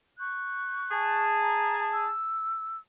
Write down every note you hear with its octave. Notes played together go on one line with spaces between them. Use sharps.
C#6 F#6 G6
G#4 A5
A#5
E6